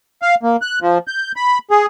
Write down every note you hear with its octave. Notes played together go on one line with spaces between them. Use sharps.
F5
A#3
F#6
F3
G6
B5
G#4